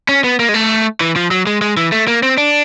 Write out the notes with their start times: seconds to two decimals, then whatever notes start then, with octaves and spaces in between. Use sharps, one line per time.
0.09 C#4
0.24 B3
0.39 A#3
0.49 G#3
0.54 A3
1.01 E3
1.16 F3
1.31 F#3
1.47 G#3
1.61 G#3
1.77 E3
1.92 A3
2.08 A#3
2.23 C4
2.38 D4